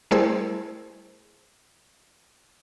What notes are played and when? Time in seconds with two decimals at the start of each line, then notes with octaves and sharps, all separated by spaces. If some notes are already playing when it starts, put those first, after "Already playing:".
0.11 G3 A3 E4 G#4 A#4 C5